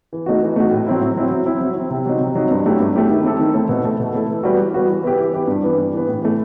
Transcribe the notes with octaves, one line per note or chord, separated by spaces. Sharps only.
E3
A3 D#4 F#4
E3
A3 D#4 F#4
A2
F#3 C4 E4
A2
F#3 C4 E4
F#3
C4 E4
F#3
C4 E4
C3
F#3 C4 D#4
C3
F#3 C4 D#4
G2
F#3 A3 E4 G4
G2
F#3 A3 E4 G4
D#3
A3 C4 E4 A4
D#3
A3 C4 E4 A4
B2
A3 E4 A4
B2
A3 E4 A4
E3
G3 B3 F#4
E3
G3 B3 F#4
E3
B3 E4 G4
E3
B3 E4 G4
G2
E3 B3
G2
E3 B3
A2
E3 A3